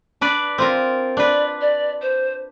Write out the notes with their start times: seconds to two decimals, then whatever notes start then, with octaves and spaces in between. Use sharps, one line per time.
0.21 D4 B4 D5
0.58 C4 F4 A#4
1.17 D4 B4 D5
1.61 D5
2.01 C5